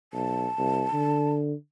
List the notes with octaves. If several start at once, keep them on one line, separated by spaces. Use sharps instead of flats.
B1 A5
C2
D3